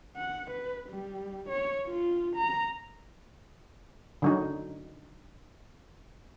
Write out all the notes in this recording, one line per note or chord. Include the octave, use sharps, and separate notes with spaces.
F#5
B4
G3
C#5
F4
A#5
D3 F#3 D#4